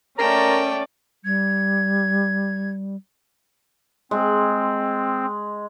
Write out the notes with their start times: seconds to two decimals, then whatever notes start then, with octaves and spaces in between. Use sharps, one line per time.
0.18 A3 C#4 A#4 D5 G5 A#5
1.24 G3 G#6
4.11 G#3 C4